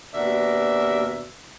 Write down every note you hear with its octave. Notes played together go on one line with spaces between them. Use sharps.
D#2 B2 D4 F#4 A#4 E5